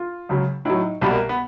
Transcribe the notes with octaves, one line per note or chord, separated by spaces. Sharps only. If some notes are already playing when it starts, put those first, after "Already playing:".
Already playing: F4
C#2 C#3 F#3
A2 F#3 D#4
C2 B2 G3 B3
A#3
B3